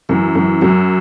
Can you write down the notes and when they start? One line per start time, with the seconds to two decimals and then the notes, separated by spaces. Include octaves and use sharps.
0.09 F#2 E3
0.35 F#2
0.61 F#2 F#3